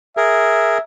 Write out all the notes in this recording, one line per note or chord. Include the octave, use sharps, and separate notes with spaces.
G#4 A#4 E5